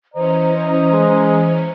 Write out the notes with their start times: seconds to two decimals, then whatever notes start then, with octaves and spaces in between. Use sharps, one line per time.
0.14 E3 C#4 C5 D#5 A#5
0.92 G#3